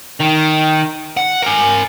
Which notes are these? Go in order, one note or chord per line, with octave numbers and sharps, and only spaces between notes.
D#3
F#5
A#4 G#5